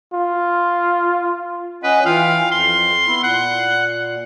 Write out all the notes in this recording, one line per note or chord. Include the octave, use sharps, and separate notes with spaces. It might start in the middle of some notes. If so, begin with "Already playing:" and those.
F4
C#4 B4 D#5 F#5
E3 F4 F5 G5
F2 C6
B3 E4
A#2 F#5